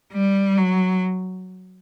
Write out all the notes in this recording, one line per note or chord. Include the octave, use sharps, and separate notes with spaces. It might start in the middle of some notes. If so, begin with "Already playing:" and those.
G3
F#3